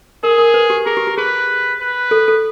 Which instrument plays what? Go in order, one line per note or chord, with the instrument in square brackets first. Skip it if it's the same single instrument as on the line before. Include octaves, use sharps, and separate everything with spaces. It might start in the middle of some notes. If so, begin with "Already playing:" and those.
[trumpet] G#4 [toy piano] A#4
[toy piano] A#4
B4
G4
[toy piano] G#4 [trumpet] A#4
[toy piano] G4
G4
[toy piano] G#4 [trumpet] B4
[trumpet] B4
[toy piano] A4
A4